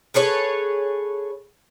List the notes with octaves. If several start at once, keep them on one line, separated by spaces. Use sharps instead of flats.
G#4 A4 B4 C#5